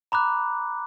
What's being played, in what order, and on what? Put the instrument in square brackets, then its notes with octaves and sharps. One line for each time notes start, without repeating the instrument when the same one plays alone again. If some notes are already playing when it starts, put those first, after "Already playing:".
[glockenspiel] A#5 B5 D6 F#6